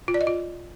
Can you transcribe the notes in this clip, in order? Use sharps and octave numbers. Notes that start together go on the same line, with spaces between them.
F4
D5
D#5
F4